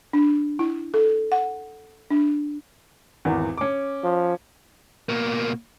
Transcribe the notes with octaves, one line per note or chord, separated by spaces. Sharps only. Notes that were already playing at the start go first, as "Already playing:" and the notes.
D4
E4
A4
F#5
D4
G#1 E2
C#4 D6
F3
B2 A#3